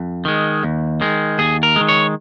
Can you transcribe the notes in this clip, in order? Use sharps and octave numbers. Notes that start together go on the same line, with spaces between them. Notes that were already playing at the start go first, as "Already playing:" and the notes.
Already playing: F2
D#3 G#3
D#2
D#3 G#3
D#2 G#4
A#4
D#3 G#3
C#5